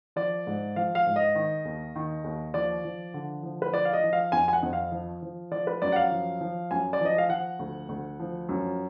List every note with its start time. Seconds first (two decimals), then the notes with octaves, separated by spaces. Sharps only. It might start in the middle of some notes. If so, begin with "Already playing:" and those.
0.16 F3 D5
0.47 G#2
0.76 F3 F5
0.95 F5
1.06 G#2
1.16 D#5
1.35 D#3
1.65 D#2
1.95 D#3
2.24 D#2
2.54 F3 D5
2.84 F3
3.14 D3
3.43 F3
3.62 B4
3.73 F3 D5
3.85 F5
3.93 D#5
4.04 F3
4.13 F5
4.32 F2 G#5
4.48 G#5
4.53 F#5
4.63 F2
4.73 F5
4.92 F3
5.22 F3
5.51 F3 D5
5.67 B4
5.82 F#2 D5
5.92 F#5
5.96 F5
6.11 F3
6.41 F3
6.71 F#2 G#5
6.93 D5
7.01 F3 D#5
7.18 F5
7.30 F3 F#5
7.59 D2
7.89 D2
8.20 F3
8.49 F#2